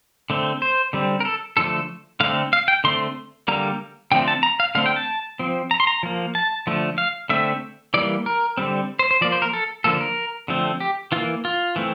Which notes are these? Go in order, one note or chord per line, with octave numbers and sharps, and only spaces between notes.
D3 A3 C4
C5
D3 G3 C4
A#4
A4
D3 F3 A3 A4
D3 A3 C4 F5
F5
G5
D3 A3 C4 C6
D3 G3 A#3 A#5
D3 F3 A3 C4 G5
A5
A#5
F5
D3 A3 C4 F5
G5
A5
F3 C4
A#5
C6
A#5
F3 A#3
A5
D3 F3 A3
F5
D3 A3 C4 E5
E3 G3 A#3 D5
A#4
D3 G3 C4
C5
C5
F3 A#3 D5
C5
A#4
A4
D3 F3 A#3 A4
A#4
D3 F3 A3 C4
G4
E3 A#3 F4
F4
E3 A3 C4